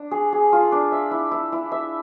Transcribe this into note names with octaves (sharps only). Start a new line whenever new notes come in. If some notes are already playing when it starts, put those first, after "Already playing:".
Already playing: D4
G#4
G#4
F4
D4
E5
E4
E4
E4
E5